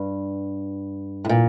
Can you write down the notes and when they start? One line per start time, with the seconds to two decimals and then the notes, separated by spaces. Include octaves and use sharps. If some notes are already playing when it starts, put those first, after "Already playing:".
Already playing: G2
1.25 A2
1.29 A#2